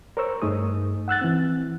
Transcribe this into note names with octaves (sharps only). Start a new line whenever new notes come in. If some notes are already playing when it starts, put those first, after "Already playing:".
A#4 C5 C#5 C#6 E6
G2 A3 D#4 G#4 D#6
F#5 E6 F#6 A6
E3 C4